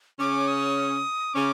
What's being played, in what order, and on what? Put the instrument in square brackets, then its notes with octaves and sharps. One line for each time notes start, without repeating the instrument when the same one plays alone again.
[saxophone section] C#3 C#4 [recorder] D6
[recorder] D#6
[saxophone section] C#3 C#4 [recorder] D6